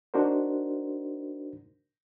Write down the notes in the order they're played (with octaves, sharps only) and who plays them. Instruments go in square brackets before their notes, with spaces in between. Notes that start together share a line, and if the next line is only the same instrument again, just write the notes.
[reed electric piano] D4 D#4 F#4 A#4 C5